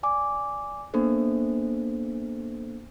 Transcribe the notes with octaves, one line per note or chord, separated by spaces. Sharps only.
D5 G#5 D6
A#3 B3 D4 A4 C5